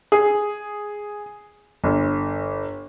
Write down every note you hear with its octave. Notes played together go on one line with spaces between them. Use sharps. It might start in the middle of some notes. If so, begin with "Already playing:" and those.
G#4
G1